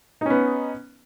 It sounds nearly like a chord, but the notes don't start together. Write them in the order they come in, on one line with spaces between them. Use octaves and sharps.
D#4 C#4 B3